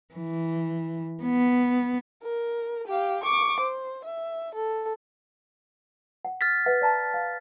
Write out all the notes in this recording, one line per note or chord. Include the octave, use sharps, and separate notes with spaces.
E3
B3
A#4
G4 F5
C#6 D6
C5
E5
A4
F#5
F6 A6 B6
B4 E5 F#5
D5 A5 A#5
F5